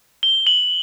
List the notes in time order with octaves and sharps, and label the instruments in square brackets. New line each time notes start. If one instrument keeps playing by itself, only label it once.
[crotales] G7
F#7